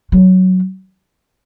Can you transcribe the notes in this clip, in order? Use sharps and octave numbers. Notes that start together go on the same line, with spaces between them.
F#3